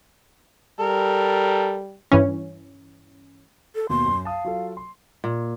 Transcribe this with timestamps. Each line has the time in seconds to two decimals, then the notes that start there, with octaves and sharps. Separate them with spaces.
0.80 G3 A4 A#4
2.12 G2 E3 C#4
3.75 A4
3.89 D#2 B2 C6
4.06 F#2
4.25 F5 A5 D#6
4.44 F#3 F4 A4
4.77 C6
5.24 A#2